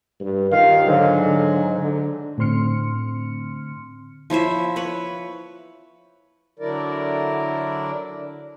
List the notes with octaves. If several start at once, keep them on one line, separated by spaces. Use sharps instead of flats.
G2
D#2 D#3 F4 F5
G#2 D3 F#3
D3
D3
A2 D3 C4 C6 F6 C#7
F3 E4 C#5 E5
B4 C#5 B5
D3 F#3 D4 E4 A#4 D5